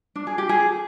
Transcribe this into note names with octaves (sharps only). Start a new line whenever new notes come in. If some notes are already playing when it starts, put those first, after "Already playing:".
D4
G#4
G4
G#4